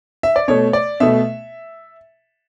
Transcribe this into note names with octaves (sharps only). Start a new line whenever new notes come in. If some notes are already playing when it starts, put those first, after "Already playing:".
E5
D5
B2 A3 C#5
D5
B2 A3 E5